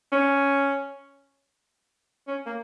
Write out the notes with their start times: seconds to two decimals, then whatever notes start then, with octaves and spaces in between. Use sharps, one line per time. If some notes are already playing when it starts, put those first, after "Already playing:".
0.12 C#4
2.27 C#4
2.46 A#3